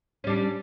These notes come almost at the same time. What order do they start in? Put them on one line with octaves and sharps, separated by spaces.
C#4 G3 D4